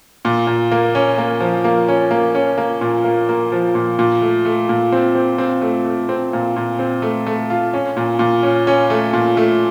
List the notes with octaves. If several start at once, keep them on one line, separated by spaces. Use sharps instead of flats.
A#2
A#2
A#3
C#4
A#3
F3
A#3
C#4
A#3
C#4
A#3
A#2
A#3
A#3
F3
A#2
A#2
A3
A3
A#2
C4
C4
C4
A3
A3
C4
A#2
A#2
C4
A3
A3
F4
C#4
A#2
A#2
C#4
C#4
A3
A#2
A3